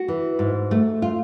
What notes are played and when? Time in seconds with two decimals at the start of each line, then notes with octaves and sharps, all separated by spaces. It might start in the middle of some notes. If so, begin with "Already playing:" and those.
Already playing: F#4
0.08 E3
0.39 G#2
0.71 A3
1.02 F4